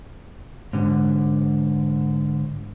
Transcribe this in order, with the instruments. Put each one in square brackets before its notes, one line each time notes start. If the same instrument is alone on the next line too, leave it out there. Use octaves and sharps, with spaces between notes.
[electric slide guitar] G#2 D3